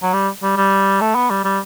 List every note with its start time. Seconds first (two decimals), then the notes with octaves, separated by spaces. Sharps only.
0.03 F#3
0.13 G3
0.43 G3
0.57 G3
1.01 A3
1.15 B3
1.30 G3
1.44 G3